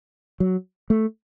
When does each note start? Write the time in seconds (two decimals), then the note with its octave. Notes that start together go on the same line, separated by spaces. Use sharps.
0.40 F#3
0.90 A3